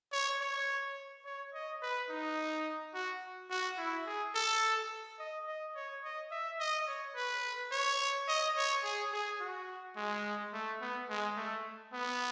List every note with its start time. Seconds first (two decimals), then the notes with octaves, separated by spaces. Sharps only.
0.13 C#5
0.41 C#5
1.26 C#5
1.53 D#5
1.82 B4
2.10 D#4
2.94 F#4
3.50 F#4
3.78 E4
4.06 G#4
4.35 A4
5.19 D#5
5.47 D#5
5.75 C#5
6.03 D#5
6.31 E5
6.60 D#5
6.87 C#5
7.15 B4
7.72 C#5
8.28 D#5
8.57 C#5
8.84 G#4
9.13 G#4
9.41 F#4
9.96 G#3
10.53 A3
10.81 B3
11.09 G#3
11.37 A3
11.93 B3